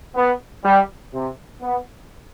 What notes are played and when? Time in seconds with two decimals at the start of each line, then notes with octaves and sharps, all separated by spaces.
0.15 B3
0.64 G3
1.13 C3
1.61 B3